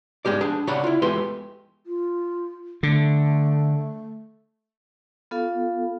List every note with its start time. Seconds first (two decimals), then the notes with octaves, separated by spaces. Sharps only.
0.25 G#2 G#3 G4 D5
0.41 D4 G#4 A5
0.67 C#3 C#5 D5 F#5 B5
0.84 E4 F4
1.02 E2 G#3 A3 G4 B4 C6
1.86 F4
2.83 D3 A3
5.31 B3 F4 A4 F5